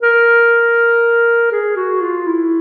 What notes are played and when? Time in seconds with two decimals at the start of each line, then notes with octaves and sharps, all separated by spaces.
0.03 A#4
1.52 G#4
1.76 F#4
2.01 F4
2.26 E4